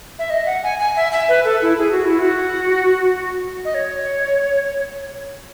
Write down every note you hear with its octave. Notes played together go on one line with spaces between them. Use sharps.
E5
D#5
F#5
G#5
G#5
E5
E5
B4
A4
E4
G#4
F#4
E4
F#4
D#5
C#5